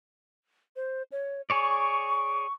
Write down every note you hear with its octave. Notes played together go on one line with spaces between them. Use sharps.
C5
C#5
G#4 C#5 D5 C#6